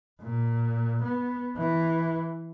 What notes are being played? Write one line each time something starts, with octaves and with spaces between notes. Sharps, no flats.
A#2
B3
E3